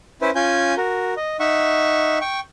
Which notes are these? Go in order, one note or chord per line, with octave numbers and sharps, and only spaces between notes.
C#4 E4 B4 C5
C#4 F4 G#5 G6
F#4 A#4
D#5
D#4 E5 F#5 C#6
G5 C#6